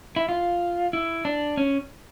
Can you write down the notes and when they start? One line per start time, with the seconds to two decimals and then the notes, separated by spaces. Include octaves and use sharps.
0.16 E4
0.29 F4
0.93 E4
1.25 D4
1.57 C#4